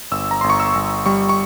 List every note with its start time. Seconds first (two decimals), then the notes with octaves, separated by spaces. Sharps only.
0.11 G1 E6
0.31 A#5
0.41 G1 C6
0.50 C#6
0.60 E6
0.75 G1
1.06 G3 C#6
1.29 C#6